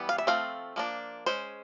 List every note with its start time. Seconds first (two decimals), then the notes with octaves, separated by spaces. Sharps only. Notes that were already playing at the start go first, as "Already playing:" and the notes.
Already playing: E3 G3 B3
0.09 F5
0.18 E5
0.27 F3 A3 C4 F5
0.76 F3 A#3 D4
1.26 G#3 C#4 C5